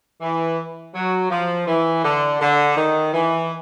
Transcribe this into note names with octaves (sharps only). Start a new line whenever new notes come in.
E3
F#3
F3
E3
D3
D3
D#3
E3